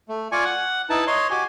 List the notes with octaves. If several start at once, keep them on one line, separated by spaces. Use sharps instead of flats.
A3
F4 D5 G#5 C#6
F#5
D#4 E4 B4 A5
C#5 D#5 C6
F#4 G4 G#5